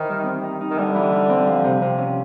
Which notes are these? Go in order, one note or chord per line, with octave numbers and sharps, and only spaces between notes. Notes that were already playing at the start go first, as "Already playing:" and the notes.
Already playing: D#3 E3 C4 D#4
G3
C4
D#4
D#4
D#3
D3 G3
E3
G3
C4
F3
C3
C3
C#4